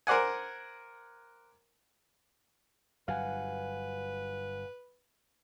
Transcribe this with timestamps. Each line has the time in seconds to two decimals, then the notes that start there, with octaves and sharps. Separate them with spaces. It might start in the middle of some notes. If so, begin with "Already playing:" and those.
0.07 A#4 C5 D5 F#5 G#5
3.08 G1 G2 F#3 B4 F5 F#5 G#5